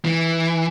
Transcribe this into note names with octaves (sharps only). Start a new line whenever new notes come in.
E3